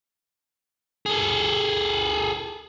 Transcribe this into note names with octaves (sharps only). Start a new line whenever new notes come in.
G#4 A4